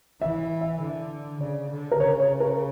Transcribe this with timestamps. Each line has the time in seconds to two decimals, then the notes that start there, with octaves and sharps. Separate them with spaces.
0.21 E3 E5
0.61 E5
0.81 D3
1.41 C#3 D5
1.70 D3
1.92 A#4
2.00 C#3 C#5
2.20 C#5
2.40 A#4